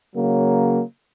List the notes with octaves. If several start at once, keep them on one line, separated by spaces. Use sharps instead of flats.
C#3 F#3 A#3